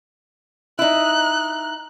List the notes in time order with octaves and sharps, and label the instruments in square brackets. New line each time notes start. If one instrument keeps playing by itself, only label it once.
[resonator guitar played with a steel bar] D#4 E4 [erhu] F#6